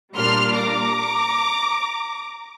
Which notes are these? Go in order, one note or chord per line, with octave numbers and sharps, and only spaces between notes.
A#2 G3 A#3 D4 C6 F6
A#5 D6